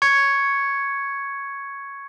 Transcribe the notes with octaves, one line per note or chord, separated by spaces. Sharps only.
C#6 G#6 C#7